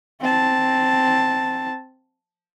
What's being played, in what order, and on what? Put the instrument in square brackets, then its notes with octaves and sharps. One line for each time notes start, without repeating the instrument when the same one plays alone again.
[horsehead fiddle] C4 A5